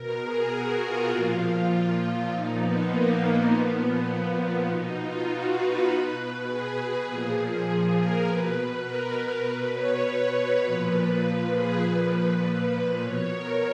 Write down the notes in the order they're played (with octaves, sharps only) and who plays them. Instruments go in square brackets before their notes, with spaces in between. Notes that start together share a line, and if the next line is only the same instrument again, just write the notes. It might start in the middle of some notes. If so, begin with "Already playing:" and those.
Already playing: [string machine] B2 A#4
G#4
F#4
F4
A#2 F3
A#2 F3 D#4
B3
A#3
A#2 F3 B3
B2 D#4
F4
F#4
B4
B2 B4
G#4
A#2 F3
G#4
A#4
B2 B4
A#4
A#4
B2 B4
C#5
B4
A#2 F3
B4
G#4
A#2 F3 B4
B2 C#5
A#4